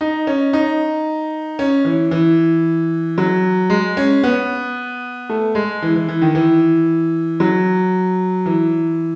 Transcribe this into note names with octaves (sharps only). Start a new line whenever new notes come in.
D#4
C#4
D#4
C#4
E3
E3
F#3
G#3
C#4
B3
A3
G#3
E3
E3
E3
D#3
E3
F#3
E3